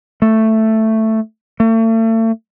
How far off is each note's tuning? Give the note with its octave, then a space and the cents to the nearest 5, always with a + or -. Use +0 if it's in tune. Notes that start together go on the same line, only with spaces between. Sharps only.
A3 +5
A3 +40